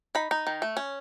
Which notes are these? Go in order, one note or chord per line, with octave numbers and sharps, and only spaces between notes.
D#4 B5
D#4
D#3
A3
C#4